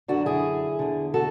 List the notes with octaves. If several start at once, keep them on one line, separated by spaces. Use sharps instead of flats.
F#2 D3 D4 F#4
E4 G#4
E2 D3
F#4 A4